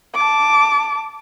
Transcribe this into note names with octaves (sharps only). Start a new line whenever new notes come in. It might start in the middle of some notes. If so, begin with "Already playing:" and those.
A5 D6